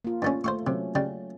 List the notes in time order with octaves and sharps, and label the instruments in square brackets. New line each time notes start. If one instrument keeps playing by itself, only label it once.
[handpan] A#3 F4
[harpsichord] G2 A3 C#4
[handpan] A3 [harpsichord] C5 F5 C#6
[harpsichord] C3 [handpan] F#3 C#4
[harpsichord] C#3 G3